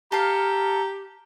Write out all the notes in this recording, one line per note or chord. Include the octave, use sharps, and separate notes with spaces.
G4 A4 F5 A#5